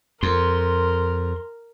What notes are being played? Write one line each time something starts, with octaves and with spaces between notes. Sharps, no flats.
F2 A#4 C6